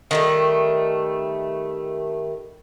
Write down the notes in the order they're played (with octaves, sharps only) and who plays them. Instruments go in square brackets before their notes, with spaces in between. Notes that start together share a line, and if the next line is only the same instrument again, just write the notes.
[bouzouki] D#3 G3 A3